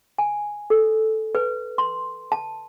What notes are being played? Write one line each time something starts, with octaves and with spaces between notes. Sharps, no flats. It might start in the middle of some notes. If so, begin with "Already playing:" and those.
G#5
A4
B4
C6
A5